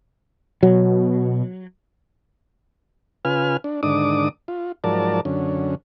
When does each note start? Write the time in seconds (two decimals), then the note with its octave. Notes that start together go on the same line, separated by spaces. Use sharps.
0.63 B2 F#3
3.25 C#3 F4 B4 G#5 F6
3.64 D4
3.83 G#2 D3 D#3 D4 D6 D#6
4.48 F4
4.84 G#2 F3 F#3 A#4 D5 A5
5.25 F#2 D3 C#4